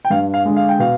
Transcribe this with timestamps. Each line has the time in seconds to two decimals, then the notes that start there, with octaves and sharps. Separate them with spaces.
0.05 G5
0.10 G2 F5
0.34 F5
0.45 D3 G#3
0.56 F5
0.69 G5
0.79 B2 F5